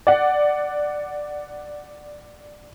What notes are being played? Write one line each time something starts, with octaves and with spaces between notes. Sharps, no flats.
D5 F#5